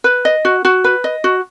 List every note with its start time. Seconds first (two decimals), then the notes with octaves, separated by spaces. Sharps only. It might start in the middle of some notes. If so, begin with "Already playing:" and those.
0.04 B4
0.25 D#5
0.45 F#4
0.65 F#4
0.84 B4
1.04 D#5
1.24 F#4